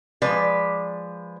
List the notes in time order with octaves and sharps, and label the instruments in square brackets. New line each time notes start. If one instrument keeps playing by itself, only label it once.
[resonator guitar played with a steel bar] F3 G#3 B4 D5